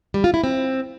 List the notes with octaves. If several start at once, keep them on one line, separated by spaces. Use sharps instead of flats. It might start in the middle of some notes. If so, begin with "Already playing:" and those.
G3
F4
E4
C4